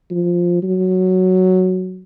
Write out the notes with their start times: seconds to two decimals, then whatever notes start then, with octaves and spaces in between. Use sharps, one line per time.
0.11 F3
0.63 F#3